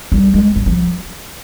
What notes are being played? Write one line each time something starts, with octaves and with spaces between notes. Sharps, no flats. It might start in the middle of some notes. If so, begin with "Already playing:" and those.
G3
G#3
G3
F3